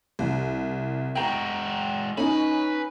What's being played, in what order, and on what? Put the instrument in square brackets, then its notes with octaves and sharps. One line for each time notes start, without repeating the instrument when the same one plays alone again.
[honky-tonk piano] C2
[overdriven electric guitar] G#3 F#4 [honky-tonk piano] G5 A#5
[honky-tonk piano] C#4 D#4 [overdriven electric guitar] B4